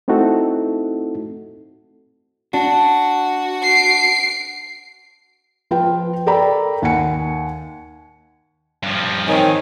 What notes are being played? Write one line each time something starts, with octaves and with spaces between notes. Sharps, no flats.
A3 C4 D#4 E4 F#4 A4
D4 F#4
C7 D7
F3 F4 B4 G5
A4 A#4 D5 G5 A#5 B5
D#2 F#5 G#5 C#7
G2 F3
D#3 C4 C#5 G#5